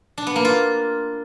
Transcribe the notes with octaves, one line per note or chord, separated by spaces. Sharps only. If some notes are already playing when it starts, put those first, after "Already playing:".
D4
B3
A#3
F4